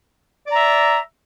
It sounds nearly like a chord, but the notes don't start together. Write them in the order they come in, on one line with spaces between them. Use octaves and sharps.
D5 A#5 E5